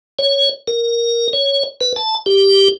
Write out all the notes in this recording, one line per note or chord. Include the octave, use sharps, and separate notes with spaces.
C#5
A#4
C#5
B4
A5
G4